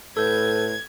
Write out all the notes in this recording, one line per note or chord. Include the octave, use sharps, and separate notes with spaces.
A2 A4 B4 G6 G#6